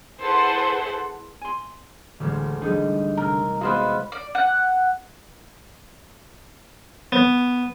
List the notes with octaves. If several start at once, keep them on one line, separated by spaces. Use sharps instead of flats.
E4 G#4 A4 B4 C5 F#5
G#5 C6
A1 D2 D3 G#3
D3 G3 D#4 G#4
C3 A#4
G#3 B3 F#4 B4 C5 D#5 F5
D5
F#5
B3